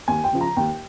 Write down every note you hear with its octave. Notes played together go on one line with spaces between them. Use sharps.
D#2 G#5
G5
C#3 F3
A#5
D#2 G5